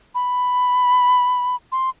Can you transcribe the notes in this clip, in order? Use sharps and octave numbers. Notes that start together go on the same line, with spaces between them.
B5
C6